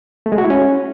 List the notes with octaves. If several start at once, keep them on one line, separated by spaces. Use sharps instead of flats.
A3
G#3
F#4
E4
C#4